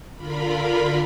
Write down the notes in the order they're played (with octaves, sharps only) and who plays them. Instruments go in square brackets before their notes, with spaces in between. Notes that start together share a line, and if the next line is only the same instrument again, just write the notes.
[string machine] D3 F4 A#4 B5